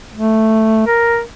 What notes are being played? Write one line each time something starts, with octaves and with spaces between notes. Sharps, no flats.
A3
A#4